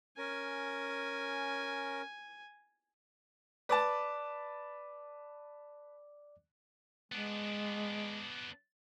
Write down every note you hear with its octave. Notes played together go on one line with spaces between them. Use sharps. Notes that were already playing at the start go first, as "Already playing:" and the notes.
C#4 A#4 G#5
B4 D5 A5 D6
G#3 B3 D4